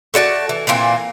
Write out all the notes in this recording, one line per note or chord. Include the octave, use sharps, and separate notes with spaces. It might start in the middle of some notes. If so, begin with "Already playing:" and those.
A3 F#4 D5 A5
E3
A#2 E3 A#3 C4